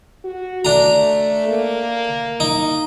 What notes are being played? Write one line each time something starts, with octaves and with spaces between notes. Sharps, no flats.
F#4
A3 D4 A#5
A#3
D#4